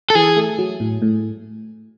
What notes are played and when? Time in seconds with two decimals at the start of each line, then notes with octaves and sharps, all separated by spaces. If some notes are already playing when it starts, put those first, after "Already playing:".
0.10 A4
0.15 E3 G#4
0.37 A3
0.58 F#3
0.80 A2
1.02 A2